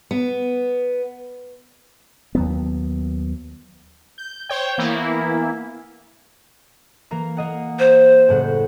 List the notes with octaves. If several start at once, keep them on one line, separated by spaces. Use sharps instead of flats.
B3
D#2 F#3 B3
G6
C5 C#5 G5
E3 A#3 B3 E4
E3 A#3 A#5
A#3 D#5 F#5
C5
F#1 A2 F#5